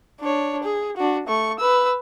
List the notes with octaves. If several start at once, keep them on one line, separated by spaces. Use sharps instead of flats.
D4 C#5
G#4
D4 F#4
A3 C#6
B4 E6